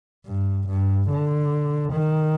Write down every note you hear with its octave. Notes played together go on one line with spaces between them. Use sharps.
G2
G2
D3
D#3